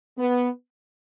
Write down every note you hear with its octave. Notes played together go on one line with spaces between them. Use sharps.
B3